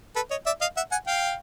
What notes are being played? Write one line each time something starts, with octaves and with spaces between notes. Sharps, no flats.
A4 B4
C#5 D#5
D5 E5
D#5 F5
E5 F#5
F#5 G#5
F5 G5